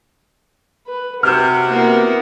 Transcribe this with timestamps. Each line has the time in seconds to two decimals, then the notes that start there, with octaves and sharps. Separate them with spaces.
0.87 B4
1.23 C3 F#4 F#5 F6 G6 E7
1.70 A#3 B3 E4